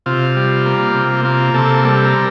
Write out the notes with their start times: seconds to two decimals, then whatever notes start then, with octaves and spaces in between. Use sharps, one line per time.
0.06 C3 F4
0.36 G3
0.66 A#3
0.95 C3
1.25 A#3 F4
1.54 C3 A4
1.84 G3 A4
2.04 A#4